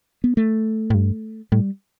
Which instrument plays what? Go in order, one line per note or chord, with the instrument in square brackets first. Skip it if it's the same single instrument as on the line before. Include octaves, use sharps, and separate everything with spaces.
[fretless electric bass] B3
A3
[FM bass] A2
G2
[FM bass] A2 [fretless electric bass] G3